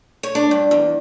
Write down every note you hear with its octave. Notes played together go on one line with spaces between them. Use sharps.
C#5
D4
G2
E2